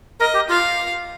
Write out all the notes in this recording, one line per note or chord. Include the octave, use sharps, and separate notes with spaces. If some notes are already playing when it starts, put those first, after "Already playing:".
A#4 D#5
G4
F4 F5